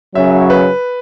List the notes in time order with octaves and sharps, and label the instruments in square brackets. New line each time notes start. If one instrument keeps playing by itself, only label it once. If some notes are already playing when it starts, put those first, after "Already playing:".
[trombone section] F#2 C#3 F#3 C#4 [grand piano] E5
[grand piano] B4